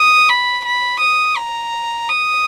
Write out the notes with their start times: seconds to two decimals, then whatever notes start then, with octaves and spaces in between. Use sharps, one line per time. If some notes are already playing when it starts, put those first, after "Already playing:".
Already playing: D#6
0.29 B5
0.65 B5
1.00 D#6
1.36 A#5
2.08 D#6